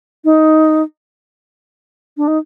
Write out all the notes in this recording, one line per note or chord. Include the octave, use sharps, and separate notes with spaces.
D#4
D4
D#4